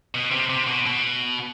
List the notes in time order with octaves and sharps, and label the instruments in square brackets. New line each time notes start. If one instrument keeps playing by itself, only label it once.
[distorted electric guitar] B2
C3
C3
B2
B2